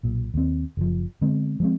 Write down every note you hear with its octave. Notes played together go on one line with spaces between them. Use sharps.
B1 A#2
D#2 C4
F#1 F3
D3 G#3 B3 C4
F3 G#3 C4